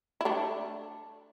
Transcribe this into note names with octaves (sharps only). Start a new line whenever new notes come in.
E4
A3 D4